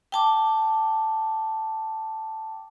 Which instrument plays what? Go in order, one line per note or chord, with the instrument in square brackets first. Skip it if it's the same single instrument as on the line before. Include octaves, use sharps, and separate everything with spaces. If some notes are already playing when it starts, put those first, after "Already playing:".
[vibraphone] G5 A5 D6